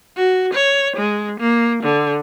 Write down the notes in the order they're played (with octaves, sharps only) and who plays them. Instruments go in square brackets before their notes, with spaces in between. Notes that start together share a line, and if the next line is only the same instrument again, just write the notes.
[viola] F#4
C#5
G#3
A#3
D3